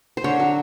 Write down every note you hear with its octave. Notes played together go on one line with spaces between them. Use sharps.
C5
D3 C#5
F#3